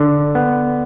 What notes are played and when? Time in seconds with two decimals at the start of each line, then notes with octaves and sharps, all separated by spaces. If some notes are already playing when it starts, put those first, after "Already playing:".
Already playing: D3
0.35 B3